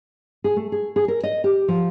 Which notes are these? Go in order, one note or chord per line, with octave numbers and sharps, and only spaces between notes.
G#4
A3
G#4
G#4
A#4
D#5
G4
F3